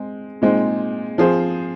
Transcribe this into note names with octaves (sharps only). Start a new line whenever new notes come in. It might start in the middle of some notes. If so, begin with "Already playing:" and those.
Already playing: G#3 C4
A#2 G#3 C4 D#4
F3 C4 F4 G#4 C5